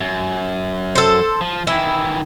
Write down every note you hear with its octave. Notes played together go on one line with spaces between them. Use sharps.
F#2
A4 C5
F3
D#3 E3 E4